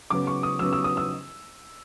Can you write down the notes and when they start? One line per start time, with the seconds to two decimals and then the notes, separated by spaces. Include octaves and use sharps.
0.10 C#3 F#3 B3 D6
0.27 C#6
0.43 D#6
0.59 C#3 F#3 B3 E6
0.73 E6
0.84 D#6
0.97 E6